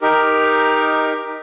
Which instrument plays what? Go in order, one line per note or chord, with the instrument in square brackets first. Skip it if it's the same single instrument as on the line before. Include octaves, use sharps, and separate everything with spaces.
[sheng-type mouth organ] D#4 G4 A#4